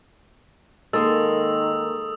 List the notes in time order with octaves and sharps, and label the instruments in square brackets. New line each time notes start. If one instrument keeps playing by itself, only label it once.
[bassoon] D#3 [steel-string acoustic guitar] G#3 A#3 [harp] A4 [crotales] D#6 E6